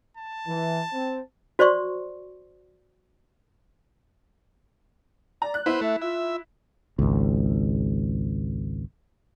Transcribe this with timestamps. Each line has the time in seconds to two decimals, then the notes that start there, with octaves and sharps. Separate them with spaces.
0.17 A5
0.47 E3
0.92 C4
1.59 F#4 C5 D5 C6 C#6
5.42 D5 A#5
5.54 F#6
5.66 B3 E4 B4 C5
5.81 A3 E5
6.02 F4 E5
6.99 G#1 C#2